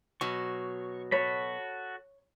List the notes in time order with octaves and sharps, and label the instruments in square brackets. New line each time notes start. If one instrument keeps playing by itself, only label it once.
[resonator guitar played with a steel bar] B2 F#3 [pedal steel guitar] C#6
[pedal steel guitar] F#4 A4 B5 [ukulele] C#5